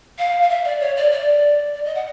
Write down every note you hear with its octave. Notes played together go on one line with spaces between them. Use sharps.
F5
F5
E5
D5
C#5
D5
D5
D5
D#5
F#5